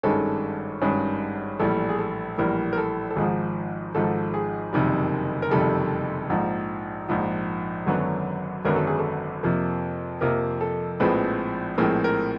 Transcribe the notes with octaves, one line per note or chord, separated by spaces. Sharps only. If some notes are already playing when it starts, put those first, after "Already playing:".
G#1 G2 D#3 G#3 C#4 A4
G#1 G2 D#3 G#3 C#4 G#4
A#1 A2 E3 G3 A4
G#4
A4
A#1 A2 E3 G3 A#4
A#4
A4
A4
G#1 G#2 F3 G#4
G#1 G#2 F3 A4
G#4
F#1 F2 C3 D#3 G3
A#4
F#1 F2 C3 D#3 G3 A4
A#1 G#2 F3
A#1 G#2 F3
G#1 F#2 D3 F#3 B3
G#1 F#2 D3 F#3 B3 A#4
A4
G#4
A4
F2 C3 F3 A#3
F2 C3 F3 A#3 A#4
A4
A#1 A2 F3 G#3 C4 B4
A#1 A2 F3 G#3 C4 A#4
A#4